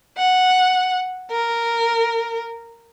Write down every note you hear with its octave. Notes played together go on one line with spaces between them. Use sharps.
F#5
A#4